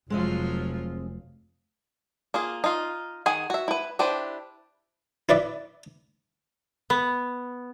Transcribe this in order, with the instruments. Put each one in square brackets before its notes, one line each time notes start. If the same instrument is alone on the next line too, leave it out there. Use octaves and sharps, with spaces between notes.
[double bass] F1 [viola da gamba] F3 F#3 F4 [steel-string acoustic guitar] G#3 C4 D#5
[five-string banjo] A#3 F4 G#4
D#4 F4
D#3 G#4 F#5 G#5
F#4 E5
E4 B4
D4 E4 G4 B4 C5
[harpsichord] E4 B4 D5 E5
[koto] B3